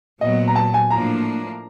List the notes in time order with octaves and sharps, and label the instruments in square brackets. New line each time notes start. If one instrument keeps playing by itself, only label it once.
[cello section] A#2 F#3 B3 [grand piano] D#5
[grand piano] A#5
A5
G#5
[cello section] A2 F3 A#3 D4 [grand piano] A#5